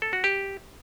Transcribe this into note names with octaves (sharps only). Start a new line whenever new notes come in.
A4
F#4
G4